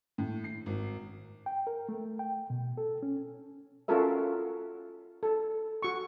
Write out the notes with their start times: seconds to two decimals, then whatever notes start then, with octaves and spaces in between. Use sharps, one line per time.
0.18 A2
0.44 C7
0.66 G#1
1.46 G5
1.67 A#4
1.89 A3
2.19 G5
2.50 B2
2.77 A4
3.03 C#4
3.88 C#4 F4 F#4 A4 A#4 E5
5.23 A4
5.82 F#4 C#6